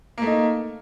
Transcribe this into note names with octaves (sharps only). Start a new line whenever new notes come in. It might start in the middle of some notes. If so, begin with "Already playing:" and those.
A3 A#3 D#4